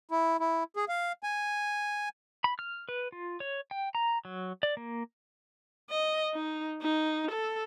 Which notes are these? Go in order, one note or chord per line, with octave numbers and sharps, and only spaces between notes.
E4
E4
G#4
F5
G#5
B5
F6
B4
F4
C#5
G5
A#5
F#3
D5
A#3
D#5
D#4
D#4
A4